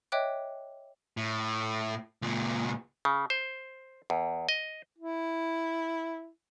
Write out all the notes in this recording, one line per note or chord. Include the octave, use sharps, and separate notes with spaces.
C#5 D#5 E5 G5 D6 F#6
A2
C#2 A#2
C#3
C5
E2
D#5
E4